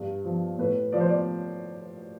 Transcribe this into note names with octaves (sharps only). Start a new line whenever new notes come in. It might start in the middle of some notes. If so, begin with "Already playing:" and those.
Already playing: G2
F3
A2 B4
F3 D5
C5
D5